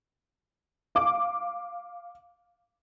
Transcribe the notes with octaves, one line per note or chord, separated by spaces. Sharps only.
F5 D6